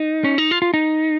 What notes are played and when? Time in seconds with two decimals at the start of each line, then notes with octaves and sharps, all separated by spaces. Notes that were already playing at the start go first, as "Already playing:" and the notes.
Already playing: D#4
0.24 C#4
0.38 D#4
0.51 F4
0.62 F4
0.74 D#4